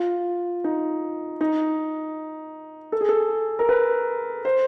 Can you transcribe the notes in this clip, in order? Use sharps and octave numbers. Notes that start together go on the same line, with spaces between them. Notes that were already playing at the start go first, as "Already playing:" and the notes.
Already playing: F4
D#4
D#4
A4
G#4
A4
A#4
B4
C5